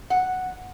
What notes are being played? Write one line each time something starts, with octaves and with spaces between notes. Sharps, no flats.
F#5